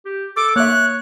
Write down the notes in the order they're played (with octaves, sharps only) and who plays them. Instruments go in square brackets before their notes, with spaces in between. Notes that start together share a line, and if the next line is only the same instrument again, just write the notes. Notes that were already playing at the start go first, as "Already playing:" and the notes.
[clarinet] G4
[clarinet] A4 [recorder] D6
[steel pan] A#3 E5 [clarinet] C#5 [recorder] F#6